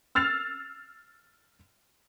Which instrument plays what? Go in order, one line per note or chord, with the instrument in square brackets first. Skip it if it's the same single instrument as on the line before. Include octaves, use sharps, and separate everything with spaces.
[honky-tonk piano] E6 F6 A6 C7 F7